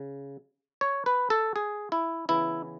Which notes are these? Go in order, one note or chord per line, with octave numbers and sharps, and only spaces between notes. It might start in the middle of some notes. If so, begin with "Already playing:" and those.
Already playing: C#3
C#5
B4
A4
G#4
E4
C#3 E3 B3 E4